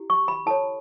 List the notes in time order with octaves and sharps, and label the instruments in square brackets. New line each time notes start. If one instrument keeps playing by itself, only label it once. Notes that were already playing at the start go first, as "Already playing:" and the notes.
Already playing: [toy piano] E4 G4
C#6
B5
E4 A4 C#5 A5